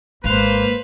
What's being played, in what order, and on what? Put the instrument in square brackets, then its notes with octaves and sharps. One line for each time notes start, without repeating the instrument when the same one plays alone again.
[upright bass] G#1 [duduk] A#3 [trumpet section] B4 [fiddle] C5 F5